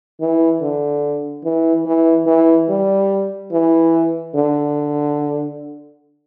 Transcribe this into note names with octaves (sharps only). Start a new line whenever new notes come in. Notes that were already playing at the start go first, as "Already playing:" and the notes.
E3
D3
E3
E3
E3
G3
E3
D3